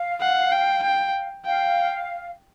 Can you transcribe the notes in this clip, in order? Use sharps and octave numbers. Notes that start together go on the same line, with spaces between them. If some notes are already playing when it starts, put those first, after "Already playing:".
Already playing: F5
F#5
G5
G5
F5 G5